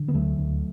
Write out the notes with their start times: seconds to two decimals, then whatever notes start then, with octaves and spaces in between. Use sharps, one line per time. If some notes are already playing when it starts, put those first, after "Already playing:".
Already playing: D3
0.08 B3
0.14 D2 F#3 A3
0.38 D2